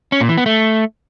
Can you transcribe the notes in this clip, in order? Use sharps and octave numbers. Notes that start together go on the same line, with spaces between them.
C#4
A#2
E3
B3
A3